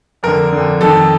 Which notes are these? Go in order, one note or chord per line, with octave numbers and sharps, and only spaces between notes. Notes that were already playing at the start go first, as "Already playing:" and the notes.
F2 D3 A#4
F2 D3
F2 D#3 A4